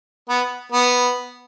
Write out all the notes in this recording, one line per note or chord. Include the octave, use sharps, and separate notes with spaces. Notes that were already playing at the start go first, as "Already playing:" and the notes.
B3
B3